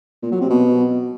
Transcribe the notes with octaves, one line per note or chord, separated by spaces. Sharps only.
A#2
F#3
C3
B2